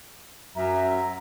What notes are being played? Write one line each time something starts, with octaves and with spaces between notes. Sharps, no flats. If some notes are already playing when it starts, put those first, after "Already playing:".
F#2 E5 A#5